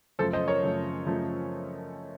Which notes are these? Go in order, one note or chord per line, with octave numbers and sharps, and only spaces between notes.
F#2 C#3 F3 A3 A4 C5
C5 D#5
A#4 C#5
F#2 C#3 F3 A3
F#2 C#3 F3 A3